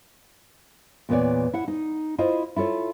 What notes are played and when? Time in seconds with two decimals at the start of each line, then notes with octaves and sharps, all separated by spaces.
1.09 E2 A#2 B3 B4 C#5 D5
1.53 E4 F#5
1.68 D#4
2.18 E4 F4 C5 D#5
2.56 E4 F4 A4 C#5